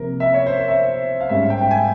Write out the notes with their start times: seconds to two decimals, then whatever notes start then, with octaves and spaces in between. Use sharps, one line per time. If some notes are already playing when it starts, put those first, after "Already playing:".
Already playing: C3 F3 A#3 A#4
0.20 E5
0.34 C#5
0.46 C5
0.68 E5
1.20 F5
1.29 G#2 G3 C#4 E5
1.50 G5
1.61 G5
1.71 G#5